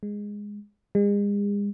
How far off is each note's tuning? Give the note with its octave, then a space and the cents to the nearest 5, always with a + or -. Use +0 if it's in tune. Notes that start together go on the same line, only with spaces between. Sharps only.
G#3 -10
G#3 -40